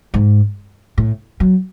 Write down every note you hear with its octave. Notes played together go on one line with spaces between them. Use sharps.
G#2
A2
F#3